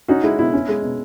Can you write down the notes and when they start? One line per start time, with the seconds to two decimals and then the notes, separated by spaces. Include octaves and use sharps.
0.08 C#4 D#4 F#4
0.23 G#3 E4
0.39 B2 E4
0.54 C#4
0.68 G#3
0.83 B2